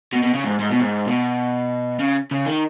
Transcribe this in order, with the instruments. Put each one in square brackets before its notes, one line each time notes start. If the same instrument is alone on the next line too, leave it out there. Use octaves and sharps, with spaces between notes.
[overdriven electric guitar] B2
B2
C#3
G#2
G#2
B2
G#2
B2
C#3
C#3
D#3